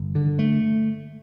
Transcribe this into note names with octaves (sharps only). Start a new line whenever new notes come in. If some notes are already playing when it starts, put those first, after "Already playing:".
Already playing: G1
D3
A3